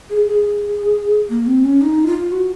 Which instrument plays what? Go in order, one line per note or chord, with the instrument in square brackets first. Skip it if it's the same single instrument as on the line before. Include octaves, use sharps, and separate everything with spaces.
[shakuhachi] G#4
G#4
A#3
C4
C#4
D#4
F4
F#4